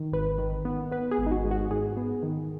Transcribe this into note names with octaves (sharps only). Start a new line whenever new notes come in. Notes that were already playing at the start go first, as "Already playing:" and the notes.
Already playing: D#3
G#1 B4
D#3
B3
B3 B4
G#4
G#1
D#4
F#4
G#2
F#4
G#2 G#4
B3
D#3